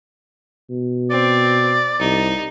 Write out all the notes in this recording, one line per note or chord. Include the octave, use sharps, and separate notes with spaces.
B2
C4 D5
C2 D#4